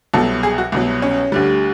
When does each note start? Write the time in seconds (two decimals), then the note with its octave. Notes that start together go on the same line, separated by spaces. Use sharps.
0.14 C2 B2 F#3 A4
0.43 G#4
0.58 F#4
0.72 C2 B2 F#3
1.02 C#4
1.32 D2 D3 G3